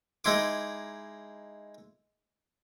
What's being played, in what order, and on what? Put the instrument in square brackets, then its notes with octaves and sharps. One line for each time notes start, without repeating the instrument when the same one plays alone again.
[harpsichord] G#3 D#4 E4 C6 D6